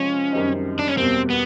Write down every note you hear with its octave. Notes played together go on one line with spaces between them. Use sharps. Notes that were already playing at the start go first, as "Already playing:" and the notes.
Already playing: C3 F3 G#3 C4 C#4 F4
F#2 D#3 G3 C4 D#4
D4
C#4
E2 B2 G3 A#3 C4
B3